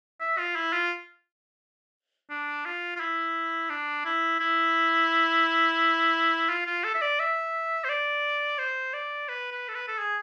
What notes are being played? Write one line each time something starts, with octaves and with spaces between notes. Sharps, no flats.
E5
F4
E4
F4
D4
F4
F4
E4
D4
E4
E4
F4
F4
A4
E5
D5
E5
C5
D5
C5
D5
B4
B4
A4
B4
A4
G#4